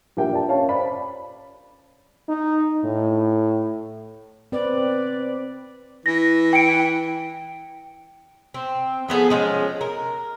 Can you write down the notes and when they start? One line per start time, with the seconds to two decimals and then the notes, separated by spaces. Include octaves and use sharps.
0.17 A#1 G4 A#4 E5 G5
0.31 A#4 D5 E5 A5
0.48 C#4 C#5 F5 A5
0.69 C5 D5 B5
2.28 D#4
2.84 A2
4.52 C4 B4 D5
6.06 E3 A#6
6.53 G5 C#7 D7
8.54 C4
9.08 F3 B3 G#4 A4
9.30 F3 G#3 C#4
9.81 A#4